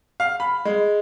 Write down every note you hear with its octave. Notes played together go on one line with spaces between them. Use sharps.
F5
B5
G#3